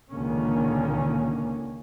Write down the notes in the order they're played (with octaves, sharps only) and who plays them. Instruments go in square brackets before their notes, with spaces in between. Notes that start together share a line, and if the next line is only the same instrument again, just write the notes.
[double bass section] C#2 A#2 D3 D#3 A#3 C#4